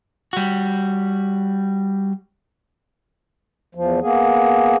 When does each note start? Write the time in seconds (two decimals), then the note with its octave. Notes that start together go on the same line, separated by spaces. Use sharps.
0.33 G3 F#4
3.75 E2 F3
4.01 A#3 B3 G#4